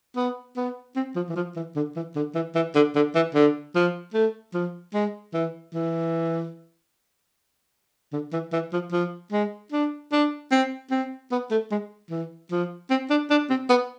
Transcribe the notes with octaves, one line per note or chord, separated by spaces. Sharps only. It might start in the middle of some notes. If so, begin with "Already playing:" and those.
B3
B3
C4
F3
E3
F3
E3
D3
E3
D3
E3
E3
D3
D3
E3
D3
F3
A3
F3
G#3
E3
E3
D3
E3
E3
F3
F3
G#3
D4
D4
C4
C4
B3
A3
G#3
E3
F3
C4
D4
D4
C4
B3